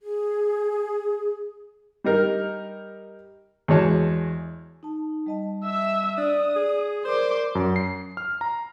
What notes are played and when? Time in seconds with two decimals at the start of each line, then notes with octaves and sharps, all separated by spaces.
0.01 G#4
2.04 G3 D#4 A#4
3.68 E2 G#3 F#4 C#5 A5
4.83 D#4 A5
5.26 G3 D#5 A5
5.65 E5 E6
6.17 D4 D5 D#6
6.56 G#4
7.05 A#4 C5 D5 C6 D6
7.55 F#2
7.76 C7
8.17 F6
8.41 A#5